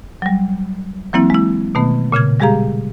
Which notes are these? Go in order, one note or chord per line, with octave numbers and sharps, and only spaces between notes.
F#3 G3
E3 F#3 A#3 C4 E4
G#3 E4
B2 D#3 A3 B3
A#2 C#3 F6 G#6
G3 G#3 G4 G#4 F5 A#5